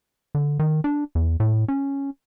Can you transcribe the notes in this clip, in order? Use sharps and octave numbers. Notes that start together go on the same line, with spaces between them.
D3
D#3
D4
E2
A2
C#4